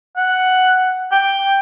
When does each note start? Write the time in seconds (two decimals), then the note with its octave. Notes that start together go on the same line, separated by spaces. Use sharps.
0.17 F#5
1.11 G5